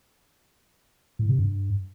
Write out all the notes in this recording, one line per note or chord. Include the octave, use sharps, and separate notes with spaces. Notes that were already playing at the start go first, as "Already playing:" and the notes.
A2
C3
G2